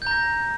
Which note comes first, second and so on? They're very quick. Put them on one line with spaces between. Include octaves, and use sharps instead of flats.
G6 A#5 A#6